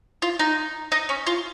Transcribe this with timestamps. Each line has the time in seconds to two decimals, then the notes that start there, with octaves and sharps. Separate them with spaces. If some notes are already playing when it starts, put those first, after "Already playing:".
0.22 F4
0.39 D#4
0.92 D#4
1.09 C#4
1.27 F4